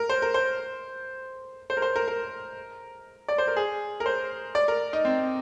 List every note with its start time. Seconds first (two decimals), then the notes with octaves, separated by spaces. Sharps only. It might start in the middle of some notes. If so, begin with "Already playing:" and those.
Already playing: A#4
0.10 C5
0.22 A#4
0.34 C5
1.70 C5
1.77 A#4
1.82 C5
1.96 A#4
2.08 A#4
3.28 D5
3.38 C5
3.47 A#4
3.57 G#4
4.00 A#4
4.06 C5
4.55 D5
4.68 A#4
4.93 D#4
5.05 C4